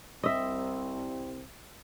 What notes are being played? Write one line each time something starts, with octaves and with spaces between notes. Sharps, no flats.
C2 C4 D#5 E5